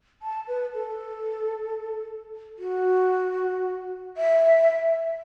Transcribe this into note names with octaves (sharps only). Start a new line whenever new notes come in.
A5
B4
A4
F#4
E5